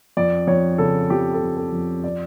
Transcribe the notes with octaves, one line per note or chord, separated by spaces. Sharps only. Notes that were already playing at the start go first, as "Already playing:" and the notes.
F2 D5
F2 C#5
C#3 A4
F3 G4
A4
F2
A4
F2
D5